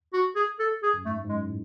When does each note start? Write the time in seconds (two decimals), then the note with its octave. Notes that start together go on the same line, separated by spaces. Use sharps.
0.13 F#4
0.36 G#4
0.59 A4
0.83 G#4
0.94 F#2
1.05 G#2 A3
1.24 G#2
1.28 F#2 G#3
1.46 A2